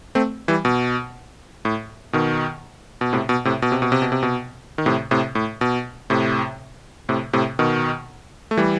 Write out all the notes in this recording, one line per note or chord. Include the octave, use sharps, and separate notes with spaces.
A3 C4
E3 G3
B2
A2
B2 D#3
B2
A2 C3
B2
A2 C3
B2
C3
B2
C3
B2
C3
B2
D#3
A2 C3
A2 C3
A2
B2
A2 C3
A2 C3
A2 C3
B2 D#3
A3
E3 G3